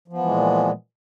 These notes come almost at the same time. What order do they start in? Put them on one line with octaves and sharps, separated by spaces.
F3 B3 E3 G#3 A#2